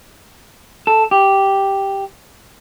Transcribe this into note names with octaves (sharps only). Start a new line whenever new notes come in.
A4
G4